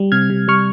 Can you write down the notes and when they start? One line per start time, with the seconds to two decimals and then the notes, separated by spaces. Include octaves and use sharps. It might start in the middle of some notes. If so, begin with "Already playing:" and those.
Already playing: G3
0.12 C3 F6 G#6
0.30 C3
0.48 G3 C#6 F6